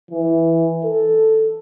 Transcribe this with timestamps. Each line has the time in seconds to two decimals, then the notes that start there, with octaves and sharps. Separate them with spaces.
0.11 E3
0.84 A4